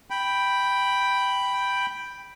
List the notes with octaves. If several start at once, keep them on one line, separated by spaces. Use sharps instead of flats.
G5 B5